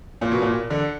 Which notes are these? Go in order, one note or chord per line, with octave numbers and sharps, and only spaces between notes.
A#2
B2
A#2
D3